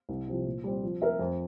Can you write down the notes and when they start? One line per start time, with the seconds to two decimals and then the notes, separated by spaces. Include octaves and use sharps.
0.09 C2
0.28 C3 F3
0.47 A#2
0.64 G3 C4
0.83 F3
1.01 C4 F4 A#4 E5
1.19 F2